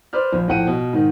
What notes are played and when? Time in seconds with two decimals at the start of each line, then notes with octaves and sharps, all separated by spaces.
0.13 B4 C5 D5 F6
0.33 A#1
0.48 A#1 A2 F#5 G5 D#7
0.67 B2
0.93 G#2 D#3